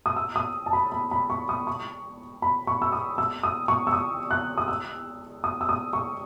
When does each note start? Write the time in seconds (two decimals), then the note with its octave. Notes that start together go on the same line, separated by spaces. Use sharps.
0.06 D#6
0.16 E6
0.36 D#6
0.66 A5
0.73 B5
0.92 B5
1.11 B5
1.30 C#6
1.49 D#6
1.67 C#6
2.42 B5
2.67 C#6
2.82 E6
2.92 D#6
3.18 E6
3.43 D#6
3.68 C#6
3.87 E6
3.93 D#6
4.31 F#6
4.58 D#6
4.68 E6
5.44 D#6
5.61 E6
5.69 D#6
5.93 C#6